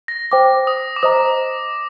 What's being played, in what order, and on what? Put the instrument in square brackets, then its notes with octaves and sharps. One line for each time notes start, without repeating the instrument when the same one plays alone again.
[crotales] A#6
[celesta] C5 G5 D6
[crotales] D#6
D6
[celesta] C5 D#5 A#5 [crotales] D#6